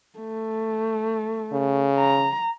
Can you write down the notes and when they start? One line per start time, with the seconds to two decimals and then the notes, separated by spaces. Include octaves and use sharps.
0.19 A3
1.52 C#3
1.99 A#5